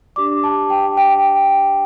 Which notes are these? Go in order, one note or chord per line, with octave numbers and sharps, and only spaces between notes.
D4 G4 D5 D6
A5
G5
G5